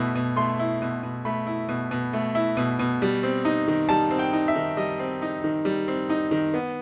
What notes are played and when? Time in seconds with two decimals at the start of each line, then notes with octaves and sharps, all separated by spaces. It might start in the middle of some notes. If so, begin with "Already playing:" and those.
Already playing: B2 A3 E4
0.15 B2
0.37 A3 C6
0.59 E4
0.82 B2
1.03 B2
1.25 A3 B5
1.47 E4
1.69 B2
1.91 B2
2.13 A3
2.35 E4
2.57 B2
2.79 B2
3.02 G3
3.23 C4
3.45 D#4
3.68 D#3
3.89 G3 A5
4.11 C4
4.19 G5
4.33 D#4
4.48 E5
4.55 D#3
4.77 G3 D#5
5.00 C4
5.22 D#4
5.44 D#3
5.65 G3
5.88 C4
6.10 D#4
6.31 D#3
6.54 B3